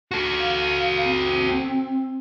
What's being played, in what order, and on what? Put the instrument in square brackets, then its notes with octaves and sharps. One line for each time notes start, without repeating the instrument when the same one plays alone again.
[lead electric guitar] F#4 A4
[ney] F5
C4